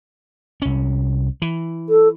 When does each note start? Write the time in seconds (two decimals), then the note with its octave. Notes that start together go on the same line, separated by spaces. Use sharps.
0.62 C2 C#4
1.42 E3
1.89 A4